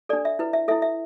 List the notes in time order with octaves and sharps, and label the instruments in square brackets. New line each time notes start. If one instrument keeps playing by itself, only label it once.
[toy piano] A4 D5
D4
E5
E4 B4
E5
A4 E5
E4
E5